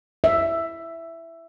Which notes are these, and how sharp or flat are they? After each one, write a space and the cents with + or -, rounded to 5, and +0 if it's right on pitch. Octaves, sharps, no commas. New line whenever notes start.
E5 +5